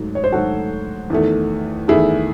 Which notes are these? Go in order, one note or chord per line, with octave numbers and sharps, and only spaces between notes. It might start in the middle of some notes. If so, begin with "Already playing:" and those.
Already playing: G#2 F#3 A3
C#5
C5
G#2 F#3 A3 F#4 A4
E2 D#3 A3
E2 D#3 A3 E4 G#4